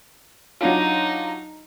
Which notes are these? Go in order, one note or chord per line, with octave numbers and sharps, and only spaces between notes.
F#3 D4 D#4 F4